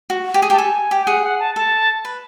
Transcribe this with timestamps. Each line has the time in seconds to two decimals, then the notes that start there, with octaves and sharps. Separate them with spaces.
0.10 F#4
0.34 G4
0.42 G#4
0.50 G4 A5
0.58 A4 G#5
0.91 G4
1.01 G5
1.07 G#4 F#5
1.24 F#5
1.40 A5
1.56 A4 A5
2.05 B4